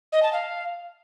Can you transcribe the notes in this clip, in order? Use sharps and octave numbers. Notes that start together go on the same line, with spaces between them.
D#5
A5
F5